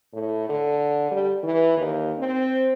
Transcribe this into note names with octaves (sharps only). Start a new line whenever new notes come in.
A2
D3
G3
E3
D#2
C4